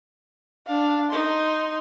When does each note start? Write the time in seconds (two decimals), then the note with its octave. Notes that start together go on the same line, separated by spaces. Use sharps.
0.67 D4 F5
1.10 D#4 C6